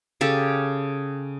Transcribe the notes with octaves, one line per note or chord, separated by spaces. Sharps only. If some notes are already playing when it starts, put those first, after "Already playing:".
C#3 G4 A4